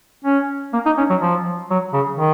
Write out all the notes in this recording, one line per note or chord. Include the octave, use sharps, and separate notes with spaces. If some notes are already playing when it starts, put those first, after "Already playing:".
C#4
A#3
D#4
C#4
F#3
F3
F#3
C#3
D#3